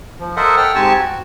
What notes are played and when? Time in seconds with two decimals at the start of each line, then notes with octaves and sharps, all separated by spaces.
0.20 F3
0.37 A4 A#4 C5 D#5 E5 F#5
0.57 A4 F#5 G5 F6
0.75 G#2 C4 G4 G#5 A5 C#6
0.99 F#4